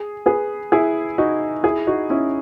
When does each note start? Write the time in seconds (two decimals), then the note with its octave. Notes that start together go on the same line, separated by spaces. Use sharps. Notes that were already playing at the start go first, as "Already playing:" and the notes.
Already playing: G#4
0.26 G#4 B4
0.72 E4 G#4
1.18 D#4 F#4
1.63 E4 G#4
1.87 D#4 F#4
2.10 C#4 E4